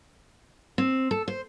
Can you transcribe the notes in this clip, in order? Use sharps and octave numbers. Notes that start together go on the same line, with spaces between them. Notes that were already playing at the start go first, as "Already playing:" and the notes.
C4
A4
C5